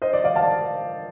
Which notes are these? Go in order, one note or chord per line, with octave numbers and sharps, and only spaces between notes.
C5 D#5
D5
D5 F5
F5 A5